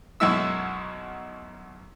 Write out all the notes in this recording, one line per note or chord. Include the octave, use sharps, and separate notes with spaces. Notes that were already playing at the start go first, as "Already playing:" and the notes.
B1 F#2 G#3 E4 E6